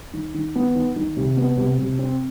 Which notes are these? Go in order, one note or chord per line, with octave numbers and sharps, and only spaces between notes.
D#3
D#3
B3
D#3
D#3
C3
B3
C3
C3
C4